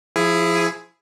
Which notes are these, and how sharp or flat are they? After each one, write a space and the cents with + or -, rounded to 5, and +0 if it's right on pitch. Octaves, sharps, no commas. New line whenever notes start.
F3 -10 E4 +15 G#4 +0